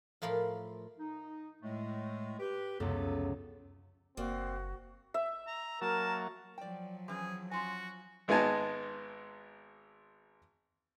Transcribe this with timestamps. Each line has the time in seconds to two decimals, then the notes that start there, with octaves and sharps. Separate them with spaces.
0.22 A2 F3 F4 A#4 F5 B5
0.99 D#4
1.63 A2 G#3 A3
2.40 G4 B4
2.80 F1 C#2 F#2 B3 A4
4.17 F#1 A#3 C4 F#4 D5
5.14 E5
5.47 A#5
5.81 F#3 A#3 A#4 A5
6.58 F3 F#3 D5 G5
7.08 E3 C4 C#4 G#4
7.51 C#4 F4 F#4 G#5
8.28 G#1 G#3 B3 D#4 G#5 A5